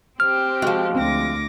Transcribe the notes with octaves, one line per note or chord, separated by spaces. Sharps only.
C4 G4 C5 F6
F3 G#3 F#4
D2 C4 D6 A#6